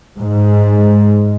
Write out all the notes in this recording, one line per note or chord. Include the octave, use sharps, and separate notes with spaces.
G#2